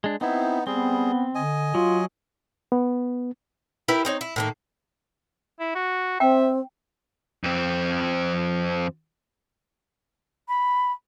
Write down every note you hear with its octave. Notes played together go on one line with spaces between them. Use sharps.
G#3 D4
B3 C4 D#4 E4
G3 B3 C4 G#4
D3 D#5 G#5
F#3 F4
B3
E4 G4 A#4 B4
C4 D#4 C#5
E4
A2 D#3 A#3
E4
F#4
C4 E5 G5
F2 C4
B5